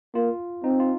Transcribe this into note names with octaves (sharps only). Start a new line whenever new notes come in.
A#3 F4
C4 D#4
F4